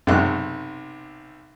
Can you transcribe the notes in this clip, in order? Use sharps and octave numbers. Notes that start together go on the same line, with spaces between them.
B1 F#2 C3 G#3 F#6